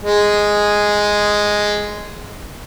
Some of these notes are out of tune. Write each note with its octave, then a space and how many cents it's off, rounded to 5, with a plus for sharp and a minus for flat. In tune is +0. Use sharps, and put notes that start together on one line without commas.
G#3 +0 G#4 -5